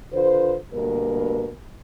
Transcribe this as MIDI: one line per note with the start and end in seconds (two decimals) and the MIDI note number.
0.12 0.55 50
0.12 0.55 65
0.12 0.55 71
0.12 0.55 72
0.72 1.51 38
0.72 1.51 43
0.72 1.51 47
0.72 1.51 58
0.72 1.51 70